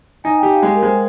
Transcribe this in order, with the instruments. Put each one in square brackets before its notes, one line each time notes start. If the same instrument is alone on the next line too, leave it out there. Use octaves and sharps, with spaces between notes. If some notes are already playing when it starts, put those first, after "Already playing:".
[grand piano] D#4 [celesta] G#5
[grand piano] G4 [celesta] G5
[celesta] F5
[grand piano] G#3
[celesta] A#4
[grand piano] G#3 [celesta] C5